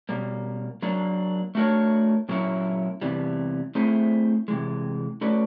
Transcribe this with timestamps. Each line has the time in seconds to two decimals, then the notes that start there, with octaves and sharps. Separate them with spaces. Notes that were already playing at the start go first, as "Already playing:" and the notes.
0.09 B2 G3 A#3
0.82 F#3 A#3 D4
1.55 A3 D4 F#4 A#4 C#5
2.29 A#2 F#3 A#3 C#4 E4
3.01 E2 C3 E3 G3
3.75 A3 C4 E4 G#4 C5
4.48 C3 E3 G#3
5.21 A3 C#4 F#4 B4 D5